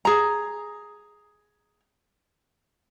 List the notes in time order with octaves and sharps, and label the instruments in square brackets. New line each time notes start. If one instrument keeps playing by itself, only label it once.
[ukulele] G#4 A#5